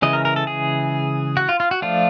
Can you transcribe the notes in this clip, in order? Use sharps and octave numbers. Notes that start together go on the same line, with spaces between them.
C#3 E3 G#3 D#5
A#4
A#4
A4
G#4
F#4
F4
F4
F#4
F3 A3 D4 F4